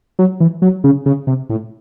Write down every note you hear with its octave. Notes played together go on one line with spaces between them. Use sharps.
F#3
E3
F#3
C#3
C#3
C3
A2